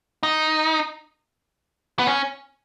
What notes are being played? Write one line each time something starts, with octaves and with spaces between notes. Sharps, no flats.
D#4
B3
C#4